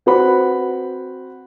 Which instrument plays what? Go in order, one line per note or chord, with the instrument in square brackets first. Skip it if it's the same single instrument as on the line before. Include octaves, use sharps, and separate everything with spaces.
[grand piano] C4 F#4 B4 C5 F#5 B5